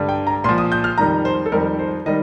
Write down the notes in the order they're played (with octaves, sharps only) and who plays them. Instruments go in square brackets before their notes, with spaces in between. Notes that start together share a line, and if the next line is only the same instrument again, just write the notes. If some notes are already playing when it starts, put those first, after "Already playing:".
Already playing: [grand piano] G2 D3 G3
G5
A#5
A#2 F3 C6
D#6
G6
F6
F2 D#3 G3 A#5
C5
A4
F2 D#3 G3 A#4
C5
D#3 G3 D#5